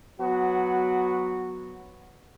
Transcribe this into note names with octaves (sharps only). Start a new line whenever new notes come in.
F#3 B3 F#4